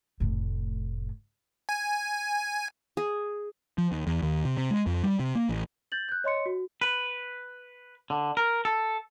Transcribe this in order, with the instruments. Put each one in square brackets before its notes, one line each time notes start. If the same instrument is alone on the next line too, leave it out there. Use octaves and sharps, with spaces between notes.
[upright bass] F1 A2
[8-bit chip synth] G#5
[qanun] G#4
[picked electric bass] F3
D#2
E2
D#2
C3
C3
G#3
F2
G3
C3
A#3
A1
[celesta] G6 A6 F#7
F#6 G6
C#5 D#5 C6 C#7
F#4
[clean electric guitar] B4
D3
A#4
A4